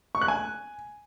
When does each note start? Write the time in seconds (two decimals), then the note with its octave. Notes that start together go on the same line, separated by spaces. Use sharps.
0.15 C#6
0.21 F#6
0.28 G#5